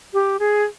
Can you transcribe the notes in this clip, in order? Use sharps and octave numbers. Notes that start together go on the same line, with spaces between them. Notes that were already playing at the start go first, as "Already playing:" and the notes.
G4
G#4